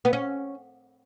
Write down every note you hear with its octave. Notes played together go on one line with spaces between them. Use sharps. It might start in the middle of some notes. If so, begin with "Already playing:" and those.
B3
C#4